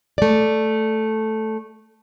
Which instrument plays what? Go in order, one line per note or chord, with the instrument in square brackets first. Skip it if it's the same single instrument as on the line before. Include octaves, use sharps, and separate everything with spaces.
[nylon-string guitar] A3 D5